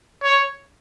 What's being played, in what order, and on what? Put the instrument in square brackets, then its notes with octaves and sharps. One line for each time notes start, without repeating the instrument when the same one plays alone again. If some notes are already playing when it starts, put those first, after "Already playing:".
[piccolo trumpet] C#5